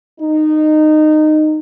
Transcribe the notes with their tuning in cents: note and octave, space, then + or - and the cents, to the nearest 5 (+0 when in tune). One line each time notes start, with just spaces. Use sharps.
D#4 -20